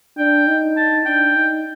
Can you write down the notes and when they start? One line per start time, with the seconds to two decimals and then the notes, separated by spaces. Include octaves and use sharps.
0.18 D4 G5
0.47 D#4
0.77 A5
1.06 D4 G5
1.35 D#4